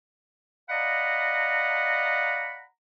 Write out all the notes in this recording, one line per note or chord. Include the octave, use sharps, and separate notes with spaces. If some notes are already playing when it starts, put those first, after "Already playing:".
D5 D#5 F5 F#5 A#5 B5